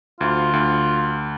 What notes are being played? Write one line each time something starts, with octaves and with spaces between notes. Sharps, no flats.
D2 F4
D2